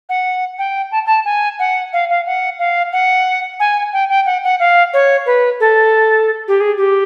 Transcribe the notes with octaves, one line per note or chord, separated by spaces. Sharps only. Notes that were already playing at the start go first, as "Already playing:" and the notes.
F#5
G5
A5
A5
G#5
F#5
F5
F5
F#5
F5
F#5
G#5
G5
G5
F#5
F#5
F5
C#5
B4
A4
G4
G#4
G4